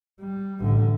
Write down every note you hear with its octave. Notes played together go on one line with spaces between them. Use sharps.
G3
A1 D3